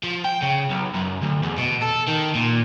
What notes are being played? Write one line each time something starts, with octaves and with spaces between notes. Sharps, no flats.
F3
G5
C#3
B1
F#2
D2
E2
B2
A4
D#3
A#2